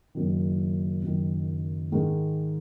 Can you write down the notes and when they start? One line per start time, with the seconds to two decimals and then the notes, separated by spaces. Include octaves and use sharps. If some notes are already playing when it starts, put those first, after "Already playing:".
0.15 F#1 F#2 D#3
1.03 F#1 F#2 D#3
1.92 G#2 D#3 G#3